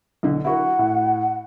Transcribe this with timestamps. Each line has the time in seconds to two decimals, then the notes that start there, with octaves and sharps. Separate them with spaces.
0.23 B1 D3
0.45 E4 F#4 A#4 F#5
0.79 A2